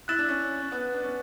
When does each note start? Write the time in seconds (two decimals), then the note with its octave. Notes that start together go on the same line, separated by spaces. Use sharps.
0.08 E4 F#6 A6 E7
0.19 D4
0.29 C#4
0.62 C#4
0.72 B3
0.93 D4
1.03 C#4